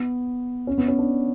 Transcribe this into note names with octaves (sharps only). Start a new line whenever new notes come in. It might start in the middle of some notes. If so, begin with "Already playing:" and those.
Already playing: B3
C#4
B3
C#4
D4